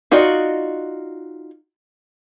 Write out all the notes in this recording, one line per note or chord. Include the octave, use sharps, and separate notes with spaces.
D#4 F4 F#4 D5 D#5